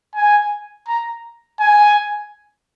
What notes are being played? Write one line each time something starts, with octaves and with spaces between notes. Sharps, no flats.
G#5
A#5
G#5